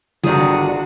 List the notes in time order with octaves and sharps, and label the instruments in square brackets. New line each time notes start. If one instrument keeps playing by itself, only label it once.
[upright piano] G1 [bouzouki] D#3 G#4 [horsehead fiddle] D4 F#4